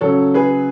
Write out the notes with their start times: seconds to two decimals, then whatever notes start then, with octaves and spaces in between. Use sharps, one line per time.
0.01 C#3 F#3 A4 C#5
0.34 G#4 B4